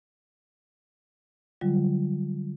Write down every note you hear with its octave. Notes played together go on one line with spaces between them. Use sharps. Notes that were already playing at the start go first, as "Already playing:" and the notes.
D3 F#3 G3 F4